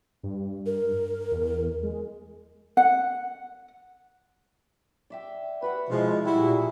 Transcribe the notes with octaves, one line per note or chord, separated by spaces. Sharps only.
G2
A#4
E2
G#3
F#5
D5 E5 G5
F#4 B4 E5 F#5
B2 F3 G#3 E4
G3 E4 F#4 G5
A#2 A3 G#4 A#4